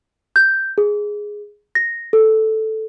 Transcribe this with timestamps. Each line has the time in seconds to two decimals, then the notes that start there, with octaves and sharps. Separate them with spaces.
0.36 G6
0.78 G#4
1.75 A#6
2.13 A4